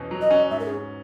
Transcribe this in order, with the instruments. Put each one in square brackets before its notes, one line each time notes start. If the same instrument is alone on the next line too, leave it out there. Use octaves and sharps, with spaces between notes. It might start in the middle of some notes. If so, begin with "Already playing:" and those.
Already playing: [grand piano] E2 B2 C#4
F#3
[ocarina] D#5
[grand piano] C#4
[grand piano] G#2 [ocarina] E5
[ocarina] A#4
G#4
[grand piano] C#4